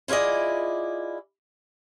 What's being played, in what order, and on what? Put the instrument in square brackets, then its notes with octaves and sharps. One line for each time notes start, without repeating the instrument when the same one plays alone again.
[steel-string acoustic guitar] E4 F4 G#4 D5 D#5